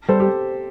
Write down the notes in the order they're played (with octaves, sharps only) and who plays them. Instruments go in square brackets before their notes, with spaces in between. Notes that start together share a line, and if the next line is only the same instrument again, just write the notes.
[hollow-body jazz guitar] G3 [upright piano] A4 C5
[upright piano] G4